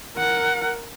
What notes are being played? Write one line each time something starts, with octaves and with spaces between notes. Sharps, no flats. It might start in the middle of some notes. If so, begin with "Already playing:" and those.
A#4 F#5